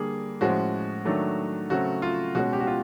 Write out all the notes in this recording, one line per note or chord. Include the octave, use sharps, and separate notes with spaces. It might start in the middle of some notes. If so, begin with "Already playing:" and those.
Already playing: D3 G3 A#3 G#4
A2 F3 G#3 C#4 F#4
D#3 F#3 A3 D4
C#3 F#3 A3 C4 F#4
F4
B2 G#3 C#4 F#4
G4
F#4
F4